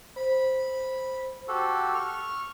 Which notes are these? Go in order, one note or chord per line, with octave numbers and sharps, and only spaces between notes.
C5 B5
F#4 G4 A4 E6
C#6 F6